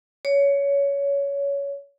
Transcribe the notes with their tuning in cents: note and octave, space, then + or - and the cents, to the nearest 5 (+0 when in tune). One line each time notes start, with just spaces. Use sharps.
C#5 +20